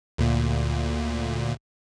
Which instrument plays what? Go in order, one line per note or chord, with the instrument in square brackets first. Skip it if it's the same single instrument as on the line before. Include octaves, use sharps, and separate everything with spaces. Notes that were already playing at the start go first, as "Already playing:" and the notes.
[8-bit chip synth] D2 A#2